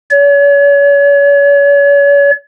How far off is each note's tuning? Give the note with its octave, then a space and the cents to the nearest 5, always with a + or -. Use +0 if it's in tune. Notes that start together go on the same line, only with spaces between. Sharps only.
C#5 +40